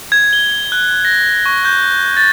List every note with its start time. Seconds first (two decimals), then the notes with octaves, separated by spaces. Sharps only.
0.12 G#6
0.33 G7
0.72 F#6
1.05 A#6
1.46 C#6
1.65 G6
2.17 A6